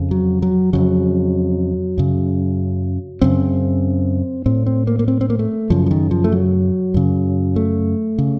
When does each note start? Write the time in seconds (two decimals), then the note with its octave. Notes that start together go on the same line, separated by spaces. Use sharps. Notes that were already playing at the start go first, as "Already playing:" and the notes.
Already playing: F2 C#3
0.11 F#3
0.42 F#3
0.73 F2 C#3 F#3
1.98 F#2 C#3
3.21 F#2 C#3 C4
4.46 A2 C4
4.66 C4
4.87 A#3
4.99 A#3
5.08 C4
5.21 C4
5.30 A#3
5.39 A3
5.70 F#2 C#3 F3
5.86 F3
5.91 D#3
6.11 F3
6.24 A3
6.32 F#3
6.94 F#2 C#3
7.56 A3
8.18 C#3